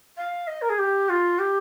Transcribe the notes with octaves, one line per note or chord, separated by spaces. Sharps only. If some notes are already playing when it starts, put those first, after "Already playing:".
F5
D#5
A#4
G#4
G4
F4
G4